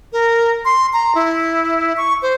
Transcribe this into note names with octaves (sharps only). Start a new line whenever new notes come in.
A#4
C6
A#5
E4
C#6
C5